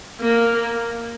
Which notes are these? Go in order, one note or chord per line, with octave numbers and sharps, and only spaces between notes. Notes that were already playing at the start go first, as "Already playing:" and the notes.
A#3